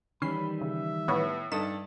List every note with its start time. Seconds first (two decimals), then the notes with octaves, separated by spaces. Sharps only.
0.22 D#3 E3 G3 C#4 B5 C7
0.61 C#3 E5
1.08 A2 B3 B4 C#5
1.52 G2 D#4 A4 D#6 E7